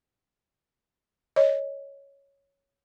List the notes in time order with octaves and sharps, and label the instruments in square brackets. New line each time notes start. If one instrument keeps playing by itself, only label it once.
[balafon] C#5 D#5